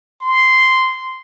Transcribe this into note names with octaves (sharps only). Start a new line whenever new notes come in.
C6